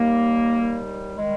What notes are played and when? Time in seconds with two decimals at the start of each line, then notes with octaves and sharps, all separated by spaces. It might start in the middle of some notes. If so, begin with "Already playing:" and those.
Already playing: D#2 D#3 G3 A#3
0.54 D#2 D#3 G3
1.16 D#3 G3 G#3